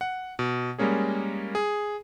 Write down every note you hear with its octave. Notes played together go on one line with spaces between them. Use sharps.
F#5
B2
G3 G#3 A#3 C#4 G#4
G#4